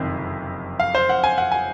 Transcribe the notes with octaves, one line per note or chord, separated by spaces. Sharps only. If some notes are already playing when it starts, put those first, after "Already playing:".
Already playing: F#1 F2 C3 D#3
F5
C5
F#5
G#5
F#5
G#5